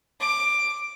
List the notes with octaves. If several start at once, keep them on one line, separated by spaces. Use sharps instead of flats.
D6